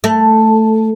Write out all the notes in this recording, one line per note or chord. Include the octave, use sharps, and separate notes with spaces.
A3